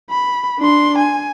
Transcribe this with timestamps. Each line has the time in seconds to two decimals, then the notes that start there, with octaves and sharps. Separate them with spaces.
0.10 B5
0.59 D4 C6
0.98 G#5